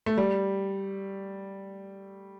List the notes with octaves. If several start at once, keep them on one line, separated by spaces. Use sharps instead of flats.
A3
G3